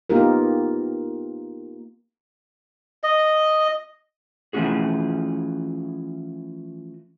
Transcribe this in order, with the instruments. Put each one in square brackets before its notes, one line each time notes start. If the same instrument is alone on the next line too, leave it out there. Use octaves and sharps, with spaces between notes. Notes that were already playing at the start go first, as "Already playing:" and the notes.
[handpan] A#3 B3 D#4 F4 G4 A#4
[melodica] D#5
[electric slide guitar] E3 F3 A3 C#4 F#4 G#4